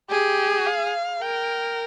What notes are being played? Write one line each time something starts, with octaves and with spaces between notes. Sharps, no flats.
G4 G#4
F5
A#4 G5